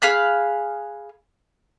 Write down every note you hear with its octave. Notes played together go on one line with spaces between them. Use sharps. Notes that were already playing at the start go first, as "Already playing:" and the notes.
G#4 F5 B5 F#6